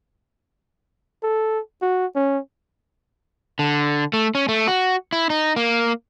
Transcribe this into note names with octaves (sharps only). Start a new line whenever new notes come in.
A4
F#4
C#4
D3
A3
C#4
A3
F#4
E4
D#4
A#3